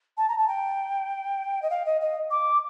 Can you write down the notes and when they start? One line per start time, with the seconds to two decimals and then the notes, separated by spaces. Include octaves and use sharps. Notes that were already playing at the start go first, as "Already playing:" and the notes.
0.17 A5
0.28 A#5
0.37 A5
0.47 G5
1.62 D#5
1.70 F5
1.85 D#5
2.00 D#5
2.30 D6